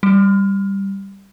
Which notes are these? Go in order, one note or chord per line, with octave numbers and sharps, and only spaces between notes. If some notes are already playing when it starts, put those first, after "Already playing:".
G3